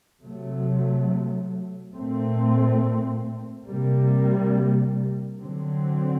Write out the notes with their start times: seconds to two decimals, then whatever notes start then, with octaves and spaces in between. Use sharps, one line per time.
0.23 C3 F#3 A3
1.95 A#2 A3 C4
3.67 C3 G3 A#3
5.39 D3 F#3 C4